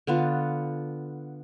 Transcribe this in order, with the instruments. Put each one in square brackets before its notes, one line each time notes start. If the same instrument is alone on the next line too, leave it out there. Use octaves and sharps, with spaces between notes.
[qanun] D3 B3 F4